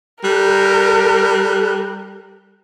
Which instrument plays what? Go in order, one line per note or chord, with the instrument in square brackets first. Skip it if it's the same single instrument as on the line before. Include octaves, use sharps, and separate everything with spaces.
[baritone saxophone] G3 [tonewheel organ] A4 A5 F#6 [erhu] A#4